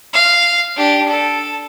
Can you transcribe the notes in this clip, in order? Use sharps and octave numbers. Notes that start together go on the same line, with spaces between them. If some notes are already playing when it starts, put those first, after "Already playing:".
F5
D4 G4
A4